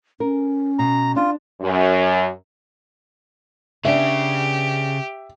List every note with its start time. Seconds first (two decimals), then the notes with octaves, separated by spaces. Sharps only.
0.20 C#4 A#4
0.79 B2 A#5
1.16 D4 F4
1.61 F#2
3.85 C#3 B3 D4 G4 E5